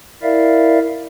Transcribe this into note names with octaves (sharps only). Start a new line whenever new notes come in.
E4 A#4 D5 E5 F5